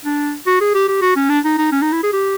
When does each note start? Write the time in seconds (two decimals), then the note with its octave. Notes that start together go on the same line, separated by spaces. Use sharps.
0.05 D4
0.47 F#4
0.61 G#4
0.75 G4
0.88 G4
1.02 F#4
1.16 C#4
1.29 D4
1.44 D#4
1.58 D#4
1.72 C#4
1.82 D#4
1.92 E4
2.03 G#4
2.13 G4